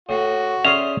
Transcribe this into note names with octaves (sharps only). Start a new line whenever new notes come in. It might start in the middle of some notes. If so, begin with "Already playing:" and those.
A2 F#4
C#4 G#4 C5 D5 E5 F7